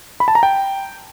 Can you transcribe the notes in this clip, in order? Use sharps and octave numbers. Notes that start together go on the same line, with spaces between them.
B5
A5
A#5
G5